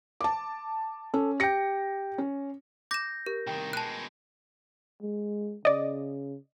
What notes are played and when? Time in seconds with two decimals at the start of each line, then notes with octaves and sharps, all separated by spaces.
0.21 A5 D6
1.14 C#4 A4
1.40 G4 G5 A#6 C#7
2.18 C#4
2.91 D6 G6 A#6 E7
3.26 G4 A#4
3.47 C2 D#3 A#4 G5
3.73 B2 G#3 A5 F#6
5.02 G#3
5.65 C#3 D5 D#5